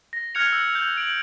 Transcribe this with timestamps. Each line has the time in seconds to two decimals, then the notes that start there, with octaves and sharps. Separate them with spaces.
0.13 A#6
0.35 F6 F#6 G#6 A#6 C#7 F7
0.53 E6
0.75 G6
0.97 D7 F#7